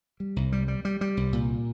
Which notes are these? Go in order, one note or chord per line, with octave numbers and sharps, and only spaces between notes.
G3
C2
G3
G3
G3
G3
C2
A#2